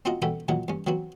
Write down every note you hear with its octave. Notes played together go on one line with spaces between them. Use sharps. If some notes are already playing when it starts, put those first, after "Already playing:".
C4 C#4 F4 F#4 D#5 A#5
B2 C#4 A4 F#5 G5 B5
A#2 D#3 F#3 F#5
G2 C#4
F#3 B3 C4 F#4